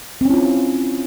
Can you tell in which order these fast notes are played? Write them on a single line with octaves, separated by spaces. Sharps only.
C4 C#4 E4 F4